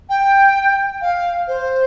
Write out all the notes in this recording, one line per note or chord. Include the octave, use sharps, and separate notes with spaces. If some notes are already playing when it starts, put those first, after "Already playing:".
G5
F5
C5